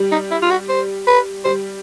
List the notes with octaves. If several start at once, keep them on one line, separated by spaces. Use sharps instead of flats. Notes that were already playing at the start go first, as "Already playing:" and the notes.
Already playing: G3
D#4
E4
F4
F#4
C5
B4
G3 C5